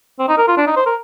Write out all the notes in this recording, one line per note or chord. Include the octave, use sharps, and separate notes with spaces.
C4
D#4
A#4
F4
D4
D#4
C5
A#4